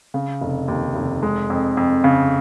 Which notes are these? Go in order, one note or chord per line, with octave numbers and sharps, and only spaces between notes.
C#3
F1
D#2
F1
G#3
F2
F2
C#3